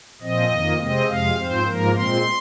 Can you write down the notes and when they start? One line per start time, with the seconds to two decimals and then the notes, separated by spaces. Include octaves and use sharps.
0.21 A#2 F3 C4 D#5
0.51 F2 D#3 A#3
0.79 C3 G#3 C4 D#5
1.08 F2 C3 G#3 F5
1.37 G#2 F3 C4 C5
1.65 G#2 F3 A#3 A#4
1.95 A#2 G#3 C4 C6